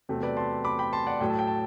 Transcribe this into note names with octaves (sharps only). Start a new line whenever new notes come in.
E2 C3 F#3 A3
B4 D5
A5 C6
B5 D6
G5 B5
A5 C6
D5 F#5
A2 F#3 A3 G5
A5
G5
A5